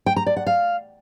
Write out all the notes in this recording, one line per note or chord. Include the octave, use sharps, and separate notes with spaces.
G5
A#5
D5
F#5
F5